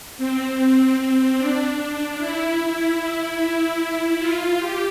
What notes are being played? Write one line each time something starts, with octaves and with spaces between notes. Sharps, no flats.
C4
C4
C4
D4
D4
E4
E4
F4
G4